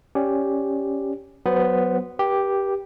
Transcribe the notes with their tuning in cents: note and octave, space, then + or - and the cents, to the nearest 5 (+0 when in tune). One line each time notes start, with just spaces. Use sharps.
C#4 +0 G4 +0 D5 +0
F#3 +0 B3 +0 C5 -20
G4 +0 B4 -45